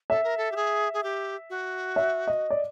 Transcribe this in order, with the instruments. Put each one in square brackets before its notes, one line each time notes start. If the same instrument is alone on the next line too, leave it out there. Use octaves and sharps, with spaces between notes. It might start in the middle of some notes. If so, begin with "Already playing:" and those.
[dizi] A4 [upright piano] E5
[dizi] A#4
A4
G4
G#4
G#4
G4
F#4
[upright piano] E5
D#5
D5